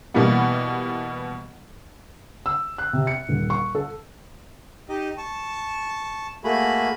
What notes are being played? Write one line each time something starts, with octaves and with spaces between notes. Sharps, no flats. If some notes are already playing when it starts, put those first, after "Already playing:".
B2 E3 G3 A#3 B3
E6
F#6
C3
C#7
D#1
C#6
A4
D#4 G4 D#5
A5 C#6
A3 A#3 F#4 G#4 B5